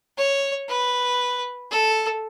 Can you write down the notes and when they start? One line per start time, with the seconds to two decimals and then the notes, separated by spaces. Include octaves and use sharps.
0.18 C#5
0.69 B4
1.71 A4